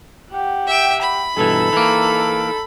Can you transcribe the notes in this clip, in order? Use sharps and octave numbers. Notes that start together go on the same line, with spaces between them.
G4 F#5
E5 G5
B5
G2 B2 E3 D#4 A4
E3 A#3